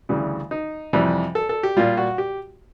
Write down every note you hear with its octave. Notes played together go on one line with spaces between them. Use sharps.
D2 C#3 E3 G3
D#4
F2 C3 E3 G3
A4
A4
G4
A#2 G3 F4
F#4
G4